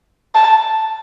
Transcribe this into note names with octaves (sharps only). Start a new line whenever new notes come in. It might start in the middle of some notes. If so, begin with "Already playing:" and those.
A5